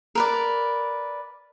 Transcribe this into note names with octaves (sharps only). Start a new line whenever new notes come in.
A#4 B4 D5